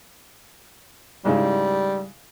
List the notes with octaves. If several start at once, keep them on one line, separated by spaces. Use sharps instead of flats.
G#2 C#3 G3 E4